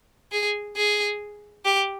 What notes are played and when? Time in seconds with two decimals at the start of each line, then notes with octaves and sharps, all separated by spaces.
0.32 G#4
0.77 G#4
1.65 G4